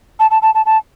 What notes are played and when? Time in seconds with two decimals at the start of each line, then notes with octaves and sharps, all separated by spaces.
0.20 A5
0.31 A5
0.42 A5
0.55 A5
0.66 A5